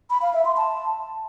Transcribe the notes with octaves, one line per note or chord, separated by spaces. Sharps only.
B5
F5
E5
C6
A5